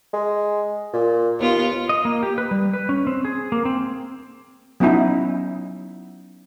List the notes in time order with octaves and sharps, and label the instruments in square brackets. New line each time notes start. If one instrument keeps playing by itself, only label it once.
[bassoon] G#3
A#2
[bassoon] D#2 [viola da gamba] B3 F4
[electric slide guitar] D#5
A#3
G4
B4
G3
B4
C#4
C4
G#4
A#3
C4
[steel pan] F#3 B3 C#4 D#4 E4